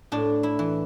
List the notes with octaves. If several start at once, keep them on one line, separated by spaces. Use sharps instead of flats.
A2 D4
E4
E3